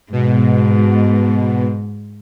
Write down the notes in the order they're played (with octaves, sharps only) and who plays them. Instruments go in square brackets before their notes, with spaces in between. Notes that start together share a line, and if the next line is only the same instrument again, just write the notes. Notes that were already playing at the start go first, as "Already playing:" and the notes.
[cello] G#2 [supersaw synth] B2